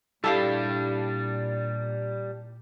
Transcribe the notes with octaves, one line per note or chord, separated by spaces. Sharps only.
A#2 G3 D4 E4 G4 A4 F5